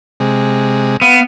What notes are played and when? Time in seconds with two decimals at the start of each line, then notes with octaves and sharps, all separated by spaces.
0.20 C3 G#3
1.02 B3 F5